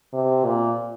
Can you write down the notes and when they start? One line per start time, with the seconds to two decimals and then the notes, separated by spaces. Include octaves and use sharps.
0.13 C3
0.45 A#2